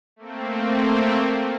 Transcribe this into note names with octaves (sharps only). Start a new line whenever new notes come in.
A3 A#3 C4